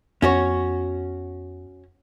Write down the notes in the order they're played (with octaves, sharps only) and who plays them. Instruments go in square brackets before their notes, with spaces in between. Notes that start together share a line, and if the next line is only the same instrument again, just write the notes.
[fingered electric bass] F2 B3 [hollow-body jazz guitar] C#4 F#4 C#5